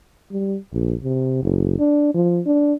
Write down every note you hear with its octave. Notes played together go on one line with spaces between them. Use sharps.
G3
A#1
C3
F#1
D4
F3
D4